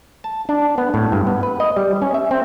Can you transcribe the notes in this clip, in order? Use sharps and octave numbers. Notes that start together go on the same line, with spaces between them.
A5
D4
B3
A2
G2
B3
B4
D#5
G3
C#4
E5
C4